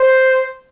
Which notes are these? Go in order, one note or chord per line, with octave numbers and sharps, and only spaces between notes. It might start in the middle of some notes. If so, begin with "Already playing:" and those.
Already playing: C5